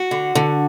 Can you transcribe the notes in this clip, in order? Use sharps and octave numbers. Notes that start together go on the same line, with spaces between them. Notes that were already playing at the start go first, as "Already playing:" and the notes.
Already playing: F#4
D3
D3